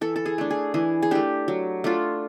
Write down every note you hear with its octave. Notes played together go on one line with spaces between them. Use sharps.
E3 A4
A4
G#4
A3 D4
G#4
E3 G#4
G#4
A3 D4 G4
F#3
A3 D4 F4